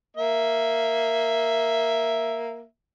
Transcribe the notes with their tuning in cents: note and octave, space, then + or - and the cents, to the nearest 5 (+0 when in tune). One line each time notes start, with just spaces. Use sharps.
A#3 +0 E5 +0